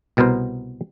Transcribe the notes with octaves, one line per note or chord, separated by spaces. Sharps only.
C2 B2 B3 A#4 C5